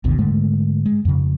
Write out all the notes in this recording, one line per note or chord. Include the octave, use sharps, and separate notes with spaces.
G#1 D#2 B2 D3
G#2 D3 G#3 A3
G#3
F2 C#3